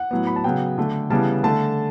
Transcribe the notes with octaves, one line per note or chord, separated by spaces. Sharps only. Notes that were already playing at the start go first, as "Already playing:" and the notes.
Already playing: F#5
A2 F#3 B3
B5
A5
C#3 F#3 B3 G5
D3 A3
C#3 E3 G3 B3 A5
D3 A3 A5